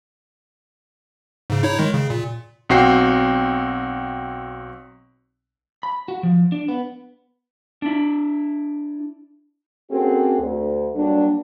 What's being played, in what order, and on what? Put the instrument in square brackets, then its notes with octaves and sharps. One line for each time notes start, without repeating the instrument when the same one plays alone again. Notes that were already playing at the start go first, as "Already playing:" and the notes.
[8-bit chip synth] G#2 C#3
D#4 E4 C#5
D#3 G#3
C#3
A#2
[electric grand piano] B1 C4 F#4 G5 C7
[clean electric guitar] B5
F#4
F3
D4
B3
[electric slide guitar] D4 E4
[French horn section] A#3 C4 C#4 F#4 G#4 A4
D2
F#3 G3 A#3 D4